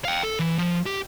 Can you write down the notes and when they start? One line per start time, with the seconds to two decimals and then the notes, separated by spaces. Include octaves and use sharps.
0.05 F5 G5
0.23 A4
0.39 E3
0.58 F3
0.86 G4